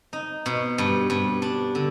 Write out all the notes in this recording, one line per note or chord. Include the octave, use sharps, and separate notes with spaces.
D#4
B2
G2
G2
D4
D3